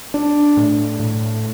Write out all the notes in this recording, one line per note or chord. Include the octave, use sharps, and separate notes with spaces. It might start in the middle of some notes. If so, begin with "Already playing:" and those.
D4
A2
A2